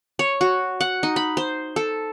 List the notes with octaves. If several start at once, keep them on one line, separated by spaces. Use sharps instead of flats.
C#5
F#4
F#5
D#4
B5
C5
A4